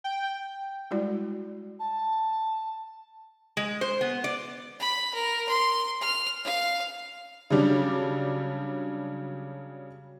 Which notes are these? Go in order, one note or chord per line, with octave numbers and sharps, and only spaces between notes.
G5
G3 G#3 E4 F#4 D5
A5
G#3
C5
B3
D5
B5
A#4
C6
F6
F5
C#3 F#3 G3 D4